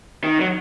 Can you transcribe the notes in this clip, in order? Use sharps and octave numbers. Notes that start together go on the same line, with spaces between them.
D#3
F#3